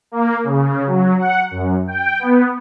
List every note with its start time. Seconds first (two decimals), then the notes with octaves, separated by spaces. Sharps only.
0.12 A#3
0.44 C#3
0.87 F#3
1.19 F#5
1.51 F#2
1.87 G5
2.19 B3